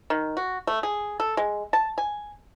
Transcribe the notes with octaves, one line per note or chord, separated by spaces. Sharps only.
D#3
F#4
A3
G#4
A4
G#3
A5
G#5